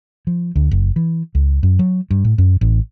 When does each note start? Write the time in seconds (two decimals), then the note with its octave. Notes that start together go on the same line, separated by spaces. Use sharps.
0.27 F3
0.56 D2
0.71 F#1
0.96 E3
1.35 C#2
1.63 F#2
1.79 F#3
2.11 G2
2.25 A2
2.38 F#2
2.61 A1